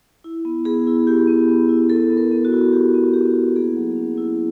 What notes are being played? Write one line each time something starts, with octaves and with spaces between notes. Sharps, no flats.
E4
B3
B3 G#4
E4
E4 G4
B3
B3
E4
E4 A4
B3
A#4
B3
F#4
E4
E4 G4
B3
B3 G4
E4
A#3 G#4
F#3
C#4
E4